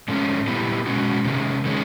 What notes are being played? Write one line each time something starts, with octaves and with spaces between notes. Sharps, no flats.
G#2 F3 A3 C#4
A#2 G3 B3 E4 G4
B2 G#3 C#4 F#4
C3 D#3 G#3 C#4
D#3 G#3 C#4